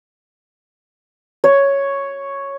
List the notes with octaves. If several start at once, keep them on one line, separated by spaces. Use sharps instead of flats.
C#5